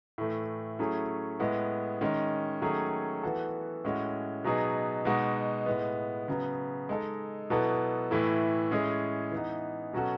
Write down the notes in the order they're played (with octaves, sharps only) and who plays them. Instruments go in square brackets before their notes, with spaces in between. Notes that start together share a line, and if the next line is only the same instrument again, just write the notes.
[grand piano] A2 E3 A3
F#3 A3 C#4 E4 G#4
A2 G#3 B3
D#3 G#3 C#4
D#3 F#3 A3 C#4 G#4
E3 B3 F#4 A4
A2 G#3 C#4 F#4
B2 F#3 B3 D#4 G#4
B2 G#3 D#4 F#4
A2 G#3 B3
C#3 F#3 B3
G#3 D#4 A4
B2 F#3 B3 E4 A4
A2 E3 A3 E4
A2 G#3 C#4 G#4
E3 B3 D#4
B2 F#3 C#4 F#4 A4